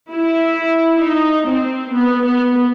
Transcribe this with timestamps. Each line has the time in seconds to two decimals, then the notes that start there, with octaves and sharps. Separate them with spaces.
0.10 E4
1.02 D#4
1.48 C4
1.94 B3
2.24 B3